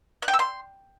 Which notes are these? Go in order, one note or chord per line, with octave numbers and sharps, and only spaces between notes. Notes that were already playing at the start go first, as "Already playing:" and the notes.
F#6
G5
E6
C6